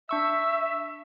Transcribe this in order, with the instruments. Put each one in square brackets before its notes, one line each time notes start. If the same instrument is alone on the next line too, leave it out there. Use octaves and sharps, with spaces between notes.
[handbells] D4 C#6 E6 [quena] E5